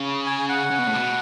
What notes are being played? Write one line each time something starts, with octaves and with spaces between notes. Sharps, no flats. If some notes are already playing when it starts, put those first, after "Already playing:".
Already playing: C#3
G#5
F#5
C#3
B2
A2
B2